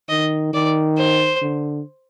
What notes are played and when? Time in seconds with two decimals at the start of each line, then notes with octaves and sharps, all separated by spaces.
0.09 D#3 D#5
0.53 D#3 D5
0.97 C5
1.42 D3